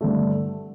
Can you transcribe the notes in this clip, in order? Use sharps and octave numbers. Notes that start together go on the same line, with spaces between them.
G2 D3 A3